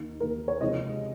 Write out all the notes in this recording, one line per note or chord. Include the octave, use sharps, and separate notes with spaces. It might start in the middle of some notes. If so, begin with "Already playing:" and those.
Already playing: D#2 D#3 A#3 D#4
D#2 D#3 A#3 D#4 A#4
C#5
C#2 C3 F3 G#3 D#4 D#5